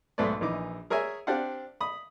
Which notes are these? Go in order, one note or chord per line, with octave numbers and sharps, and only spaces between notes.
B1 G#2 A3 B4 D5
A#1 E3 D#4 D6
G#4 A#4 C#5 E5 G#5
C4 D4 G4 D5 F5 F#5
B5 D#6